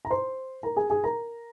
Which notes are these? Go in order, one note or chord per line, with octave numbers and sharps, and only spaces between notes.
A#5
C5 C6
A#4 A#5
G#4 G#5
G#4 G#5
A#4 A#5